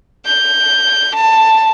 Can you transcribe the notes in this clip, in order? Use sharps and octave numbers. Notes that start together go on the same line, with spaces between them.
G6
A5